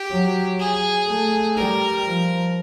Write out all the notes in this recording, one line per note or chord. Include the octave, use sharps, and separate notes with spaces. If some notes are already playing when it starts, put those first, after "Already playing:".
Already playing: G4
F#3
G#4
A3
G3 A#4
F3